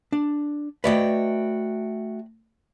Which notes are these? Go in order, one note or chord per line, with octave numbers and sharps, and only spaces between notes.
D4
A3 F#4 B4 D5 D#5 G5